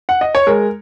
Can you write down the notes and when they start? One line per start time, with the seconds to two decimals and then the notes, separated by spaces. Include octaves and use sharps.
0.09 F#5
0.21 D#5
0.35 C#5
0.47 G#3 A#4